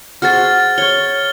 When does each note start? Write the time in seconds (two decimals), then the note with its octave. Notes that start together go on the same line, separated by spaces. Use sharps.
0.22 F#4 G#4 C5 F6 A6
0.78 C#5 C#6 G7